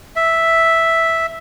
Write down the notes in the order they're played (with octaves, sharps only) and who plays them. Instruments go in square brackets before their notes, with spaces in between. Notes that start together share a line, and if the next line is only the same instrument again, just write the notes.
[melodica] E5